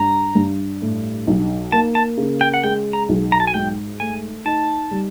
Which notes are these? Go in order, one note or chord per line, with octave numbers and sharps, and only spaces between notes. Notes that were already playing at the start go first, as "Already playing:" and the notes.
Already playing: G2 A#5
G2
A2
B1
A#3 A5
A5
C#3
G5
F#5
G#3 G5
A#5
B1
A#5
A5
G#5
G#2 G5
A3 G#5
D#4 A5
G3